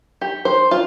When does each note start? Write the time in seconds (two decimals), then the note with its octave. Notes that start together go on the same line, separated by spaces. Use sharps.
0.21 G4
0.45 C5
0.71 F4